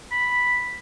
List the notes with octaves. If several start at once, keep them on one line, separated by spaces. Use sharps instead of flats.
B5